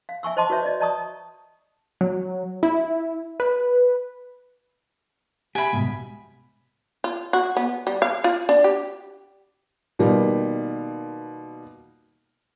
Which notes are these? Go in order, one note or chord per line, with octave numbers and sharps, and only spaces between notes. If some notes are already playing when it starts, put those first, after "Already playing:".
F5
E5 G#5 C#6 E6
C5 D#5 A5 C6 D6
F#4 B4 C#5 E5
D5 D#5
D5 D#5 A5 A#5 C#6 D#6
F#3
E4
B4
G4 E5 G#5 B5
C2 G#2 B2
F4
F#4
B3
G3
F5
F4
D4
G4
B2 D#3 G3 A#3 F4